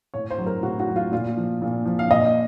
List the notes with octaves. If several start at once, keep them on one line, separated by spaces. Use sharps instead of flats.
A2 C#5
C5
F#3
A#4
A2 F#4
F#4
F#3
F4
A#2 F4
F3
A#2
F3
F5
A#2 D#5